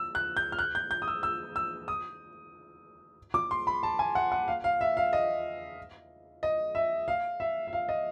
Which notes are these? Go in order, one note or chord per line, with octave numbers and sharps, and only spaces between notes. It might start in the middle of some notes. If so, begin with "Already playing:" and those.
Already playing: E6
F#6
G6
F6
F#6
G6
G6
D#6
E6
E6
E6
D#6
D6
C6
B5
A5
G#5
F#5
F#5
F5
F5
E5
F5
D#5
D#5
E5
F5
E5
E5
F5
D#5